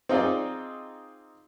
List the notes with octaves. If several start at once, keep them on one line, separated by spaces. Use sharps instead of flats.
C4 D#4 F4 G#4 D5